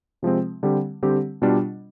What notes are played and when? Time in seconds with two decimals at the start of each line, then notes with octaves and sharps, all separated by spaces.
0.22 C3 F3 G#3 C4
0.63 D3 G3 C4 G4
1.03 D3 G3 C4 G4
1.42 B2 G3 D4 F4